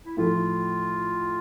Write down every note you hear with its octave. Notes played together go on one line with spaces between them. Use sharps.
E4
A2 F3 A3 F4